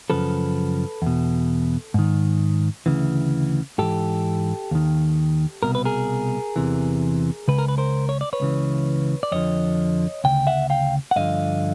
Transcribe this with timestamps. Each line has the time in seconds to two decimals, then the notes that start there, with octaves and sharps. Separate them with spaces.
0.10 F#2 C#3 F3 A4 B4
1.02 E2 B2
1.94 G#2 D#3
2.86 D2 C#3 E3
3.78 G#2 E3 G4 A4
4.71 D#2 D#3
5.63 C2 B2 A#4
5.75 B4
5.85 G#4 A#4
6.56 E2 C3 E3
7.48 C#2 C#3 B4
7.58 A#4
7.68 B4
7.78 A#4 C5
8.09 C#5
8.21 D5
8.33 B4 C#5
8.40 C#2 C#3 E3
9.23 D5
9.32 F2 D3 F3 C#5 D#5
10.24 D2 C#3 G5
10.47 E5 F#5
10.70 F5 G5
11.11 F#5
11.16 G2 D3 F3 D#5 F5